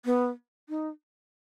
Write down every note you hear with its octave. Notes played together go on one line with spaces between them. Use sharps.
B3
D#4